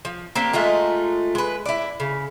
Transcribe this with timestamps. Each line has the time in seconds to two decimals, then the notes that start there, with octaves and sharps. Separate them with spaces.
0.05 F3
0.35 A#3 C4 D4 G4
0.53 G#3 A3 D#4 F4
1.35 G#3 B4
1.66 E4 D5
2.00 C#3